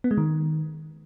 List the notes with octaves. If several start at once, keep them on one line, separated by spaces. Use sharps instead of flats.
B3
G#3
D#3